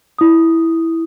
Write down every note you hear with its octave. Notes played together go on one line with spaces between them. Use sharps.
E4 D#6